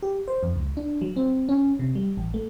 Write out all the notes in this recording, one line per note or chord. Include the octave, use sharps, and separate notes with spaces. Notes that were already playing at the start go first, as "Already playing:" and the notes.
G4
C5
F2
C#2
D4
F#3
C4
C#4
C3
G3
A1
A3